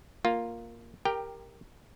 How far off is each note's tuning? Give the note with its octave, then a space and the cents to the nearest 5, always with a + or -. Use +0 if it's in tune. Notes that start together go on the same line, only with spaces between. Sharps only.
A#3 +0 F4 +5
G4 +15 A#4 +0 G5 +0